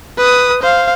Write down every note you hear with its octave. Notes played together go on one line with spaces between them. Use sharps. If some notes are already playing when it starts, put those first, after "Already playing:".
B4 D#6
C5 F5